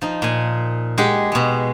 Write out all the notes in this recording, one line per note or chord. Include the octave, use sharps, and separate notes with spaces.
F3 D#4
A#2 G#5
G#3 G4 G#4 F#5
B2 G#3